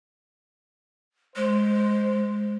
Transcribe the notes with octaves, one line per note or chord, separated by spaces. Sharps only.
G#3 C5